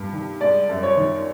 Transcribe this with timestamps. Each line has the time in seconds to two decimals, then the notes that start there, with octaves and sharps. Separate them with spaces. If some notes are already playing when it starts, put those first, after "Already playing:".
Already playing: G2
0.13 D#3
0.41 G#3 D5
0.69 F#2
0.83 C#5
0.97 D#3